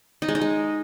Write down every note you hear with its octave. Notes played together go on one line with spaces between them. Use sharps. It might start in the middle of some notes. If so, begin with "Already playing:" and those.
D#4
G#3
D#4
G#3